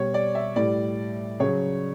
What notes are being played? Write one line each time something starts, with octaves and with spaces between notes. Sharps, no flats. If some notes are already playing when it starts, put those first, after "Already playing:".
Already playing: B2 G3 C#5
D5
E5
A2 G3 D5
C#3 F#3 C#5